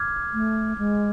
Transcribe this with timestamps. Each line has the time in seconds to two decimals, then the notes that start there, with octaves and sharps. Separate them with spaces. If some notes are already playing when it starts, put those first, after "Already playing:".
Already playing: D6 F6 G#6
0.34 A3
0.78 G#3